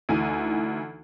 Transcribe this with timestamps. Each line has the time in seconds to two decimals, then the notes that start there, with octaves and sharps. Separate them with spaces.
0.09 D2 E3 D#4 G#5 D#7